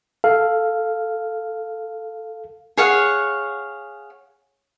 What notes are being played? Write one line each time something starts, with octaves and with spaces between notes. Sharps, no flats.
A4 F5
G#4 C#5 F5 F#5